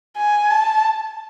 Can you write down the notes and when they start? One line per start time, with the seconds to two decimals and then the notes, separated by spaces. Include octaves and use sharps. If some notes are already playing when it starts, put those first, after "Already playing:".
0.16 G#5
0.51 A5